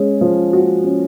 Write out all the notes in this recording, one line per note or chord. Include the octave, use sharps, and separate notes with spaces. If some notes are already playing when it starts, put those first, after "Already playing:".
Already playing: G#3 C#4
F3
F#4
C#4